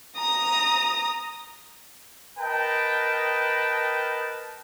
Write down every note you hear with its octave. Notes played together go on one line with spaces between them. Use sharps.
A#5 D#6
A#4 B4 D#5 G5 A5